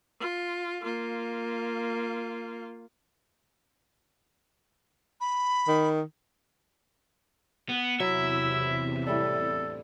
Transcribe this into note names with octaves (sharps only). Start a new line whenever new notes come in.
F4
A#3 F4
B5
D#3
B3
E2 C3 E3 F#3 E4 E5
A2 G3 D4 A4